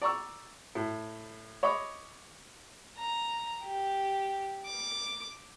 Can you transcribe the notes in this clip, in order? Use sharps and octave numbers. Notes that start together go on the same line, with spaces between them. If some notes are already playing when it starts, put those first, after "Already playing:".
D5 A#5 C#6 E6
A2
C#5 D#5 B5 C#6 D6
A#5
G4
D6